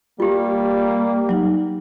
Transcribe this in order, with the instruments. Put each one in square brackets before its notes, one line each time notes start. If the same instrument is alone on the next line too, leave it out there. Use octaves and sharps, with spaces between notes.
[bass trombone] G3 [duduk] A#3 [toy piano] F4 G4
[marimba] F#3 D#4